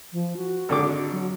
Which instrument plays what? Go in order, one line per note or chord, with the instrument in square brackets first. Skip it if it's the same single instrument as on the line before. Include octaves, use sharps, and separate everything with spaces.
[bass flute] F3
F#4
[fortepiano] G#1 D3 D6
[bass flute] F#3